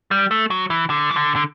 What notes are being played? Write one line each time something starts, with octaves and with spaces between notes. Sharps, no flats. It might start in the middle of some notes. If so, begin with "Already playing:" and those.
G3
A3
F#3
E3
D3
E3
D3
D3